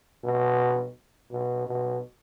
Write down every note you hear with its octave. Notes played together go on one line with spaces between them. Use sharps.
B2
B2
B2